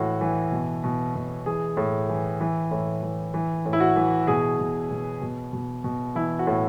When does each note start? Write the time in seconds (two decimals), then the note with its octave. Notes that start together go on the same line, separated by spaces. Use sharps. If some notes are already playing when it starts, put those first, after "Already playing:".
Already playing: A2 E3 F#4
0.21 E3
0.52 B2
0.84 B2
1.15 B2
1.46 E3 G#4
1.77 A2
2.09 E3
2.41 E3
2.71 A2
3.03 E3
3.34 E3
3.65 A2
3.73 E4
3.80 F#4
3.96 E3
4.27 B2 G#4
4.59 B2
4.91 B2
5.21 B2
5.53 B2
5.84 B2
6.15 E3 E4
6.39 F#4
6.47 A2